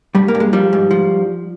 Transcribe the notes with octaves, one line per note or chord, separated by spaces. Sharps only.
G2 G3
A#3
G2
G#3
F3 G3
G#2
F3